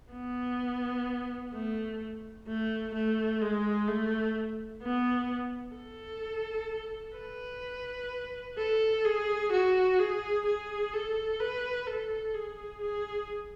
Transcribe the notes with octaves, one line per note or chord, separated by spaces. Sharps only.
B3
A3
A3
A3
G#3
A3
B3
A4
B4
A4
G#4
F#4
G#4
G#4
A4
B4
A4
G#4
G#4